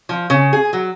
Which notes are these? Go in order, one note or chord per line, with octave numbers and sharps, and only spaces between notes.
F3
C#3
G#4
F#3